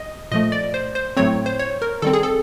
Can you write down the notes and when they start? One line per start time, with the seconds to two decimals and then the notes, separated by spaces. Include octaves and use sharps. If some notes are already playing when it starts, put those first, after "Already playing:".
Already playing: D#5
0.32 A#2 F3 A3 D#5
0.52 D5
0.74 C5
0.95 C5
1.17 A2 F#3 A3 C4 C#5
1.46 C5
1.59 C#5
1.82 A#4
2.02 D#3 G3 C4 A4
2.13 G#4
2.23 A4